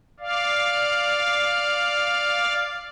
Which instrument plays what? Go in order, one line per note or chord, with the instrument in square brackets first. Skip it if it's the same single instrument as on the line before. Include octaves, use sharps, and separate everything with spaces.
[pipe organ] D5 F5